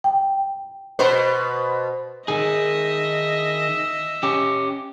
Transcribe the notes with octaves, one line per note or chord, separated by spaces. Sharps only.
G5
B2 B4 C5
D#3 G#4 D#5 E5
C#4 G4